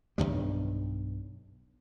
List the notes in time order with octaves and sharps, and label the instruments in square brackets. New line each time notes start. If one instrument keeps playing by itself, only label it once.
[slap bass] B1 E2 G2 G3